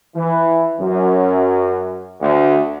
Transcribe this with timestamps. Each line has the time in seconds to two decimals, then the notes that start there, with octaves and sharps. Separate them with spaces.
0.15 E3
0.80 F#2
2.21 D2